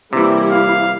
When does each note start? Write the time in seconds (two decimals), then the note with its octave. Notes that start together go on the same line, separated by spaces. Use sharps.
0.13 C3 E3 G3 A#3 E4
0.51 F5